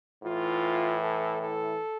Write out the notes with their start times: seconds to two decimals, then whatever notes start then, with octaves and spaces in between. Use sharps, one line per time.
0.23 A2 E3 F4
1.01 A4
1.41 A4